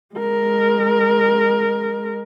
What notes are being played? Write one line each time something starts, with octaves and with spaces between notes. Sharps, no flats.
G#3 A#4